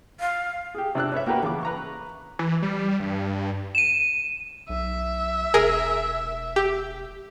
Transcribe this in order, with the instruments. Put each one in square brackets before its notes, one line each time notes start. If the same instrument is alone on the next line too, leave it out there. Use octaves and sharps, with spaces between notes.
[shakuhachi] F5
[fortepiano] G4 G#4
C3 D4 E6 F#6
C#4 B4 C#5 E5
A#3 F#4 G4 A#4 B4
A1 C#3 D6
B4 A#5 C#6
[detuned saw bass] E3
G3
G2
[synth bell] D#7 E7
[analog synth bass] B1 [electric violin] E5
[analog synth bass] E1 [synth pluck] G#4 A#4
[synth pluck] G4